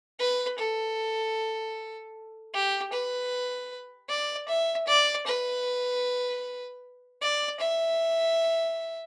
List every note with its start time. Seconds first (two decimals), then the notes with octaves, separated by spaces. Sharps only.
0.19 B4
0.59 A4
2.54 G4
2.93 B4
4.09 D5
4.49 E5
4.88 D5
5.27 B4
7.22 D5
7.60 E5